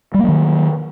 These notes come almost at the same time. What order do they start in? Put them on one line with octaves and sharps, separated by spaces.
G3 A#3 F#3 D#3